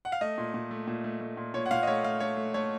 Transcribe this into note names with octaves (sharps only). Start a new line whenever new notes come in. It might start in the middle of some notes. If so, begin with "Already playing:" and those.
F#5
F5
A3 D#5
A#2
A#2
A3
A#2
A3
A3
A#2
A#2 C#5
F#5
A#2 F5
D#5
A3 C#5
A3 F5
A3 C#5
A3
A3 C#5